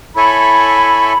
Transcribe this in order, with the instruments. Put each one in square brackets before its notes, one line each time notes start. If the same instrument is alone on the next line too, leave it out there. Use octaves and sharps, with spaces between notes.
[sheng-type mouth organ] E4 A4 C#5 E5 G#5 [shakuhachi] B5